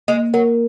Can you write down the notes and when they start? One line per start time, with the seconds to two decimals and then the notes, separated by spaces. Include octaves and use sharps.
0.08 G#3 A#3
0.34 F#3 A#4